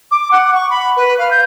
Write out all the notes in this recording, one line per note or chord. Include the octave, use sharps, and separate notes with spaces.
D6
F#5
C#6
B5
B4
F5
G6